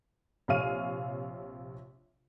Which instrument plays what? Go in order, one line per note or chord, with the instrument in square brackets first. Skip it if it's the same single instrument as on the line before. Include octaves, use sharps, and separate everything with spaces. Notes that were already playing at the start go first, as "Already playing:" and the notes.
[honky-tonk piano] A#1 C3 C#5 F5 F6 D#7